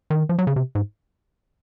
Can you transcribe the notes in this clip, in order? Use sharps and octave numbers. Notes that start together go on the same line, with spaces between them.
D#3
F3
F#3
C#3
C3
G#2